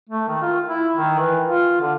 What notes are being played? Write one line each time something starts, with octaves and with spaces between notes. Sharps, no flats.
A3
D#3
F4
E4
D#3
E3
F4
D3